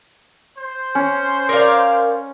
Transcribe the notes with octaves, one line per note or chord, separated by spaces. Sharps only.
C5
C#4
A#4 D5 F5